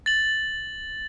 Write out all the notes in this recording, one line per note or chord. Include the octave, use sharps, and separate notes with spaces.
A6 F#7